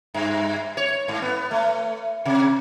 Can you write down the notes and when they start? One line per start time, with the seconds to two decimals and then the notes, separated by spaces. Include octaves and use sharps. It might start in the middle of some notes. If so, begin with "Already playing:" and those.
0.14 G2
0.77 C#5
1.08 G#2
1.22 B3
1.51 A3
2.25 C3